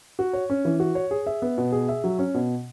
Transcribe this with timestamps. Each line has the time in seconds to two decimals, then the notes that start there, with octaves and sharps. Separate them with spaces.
0.19 F#4
0.33 C#5
0.50 C#4
0.65 E3
0.80 F#4
0.95 C#5
1.11 G#4
1.27 E5
1.42 B3
1.58 B2
1.72 G#4
1.89 E5
2.04 F#3
2.19 C#4
2.34 B2